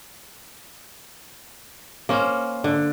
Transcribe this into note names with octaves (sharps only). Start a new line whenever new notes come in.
A#3 C#4 C5
D3